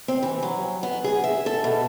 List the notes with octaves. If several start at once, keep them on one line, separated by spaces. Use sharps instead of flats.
C4
E3
F#3
B3
G#4
E5
A4
B2